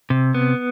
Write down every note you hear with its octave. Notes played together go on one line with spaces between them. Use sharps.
C3
B3